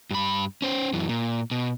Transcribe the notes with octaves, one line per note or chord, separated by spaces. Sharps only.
G2 B5
C#4 C5
F#2 E3
A#2
B2